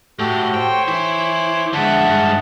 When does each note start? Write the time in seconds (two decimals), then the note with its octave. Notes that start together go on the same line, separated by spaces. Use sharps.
0.19 A2 F#4 G4 A4
0.54 C5 C#5 G5
0.88 E3 E4 D6
1.74 D3 G#3 E5 F#5 A5
2.05 G2 G#3